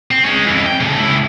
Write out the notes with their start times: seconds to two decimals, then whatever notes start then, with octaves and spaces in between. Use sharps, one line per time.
0.11 C4
0.25 G#3 C#4
0.46 F2 E3
0.66 G5
0.80 C#3 A3
0.97 C#2 E4